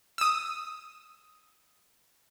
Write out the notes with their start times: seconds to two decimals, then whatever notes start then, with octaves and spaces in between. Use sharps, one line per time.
0.18 D#6 E6